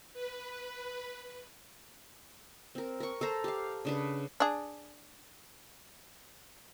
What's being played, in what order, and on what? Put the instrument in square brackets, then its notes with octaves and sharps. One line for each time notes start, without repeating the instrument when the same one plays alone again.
[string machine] B4
[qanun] C4 A#4
A#4 C#6
A4 C5 A#5
G4 F5
C#3 D4 B4
[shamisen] D4 G#4